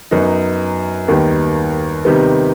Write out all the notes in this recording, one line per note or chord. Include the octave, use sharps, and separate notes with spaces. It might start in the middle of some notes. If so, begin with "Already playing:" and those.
F#2 F#3 B3 D#4
D#2 D#3 G3 B3
C3 D#3 G3 B3